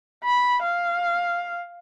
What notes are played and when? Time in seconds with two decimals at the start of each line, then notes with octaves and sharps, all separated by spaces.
0.24 B5
0.62 F5